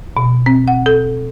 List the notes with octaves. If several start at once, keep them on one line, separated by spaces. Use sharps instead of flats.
B2
C4
F#5
A4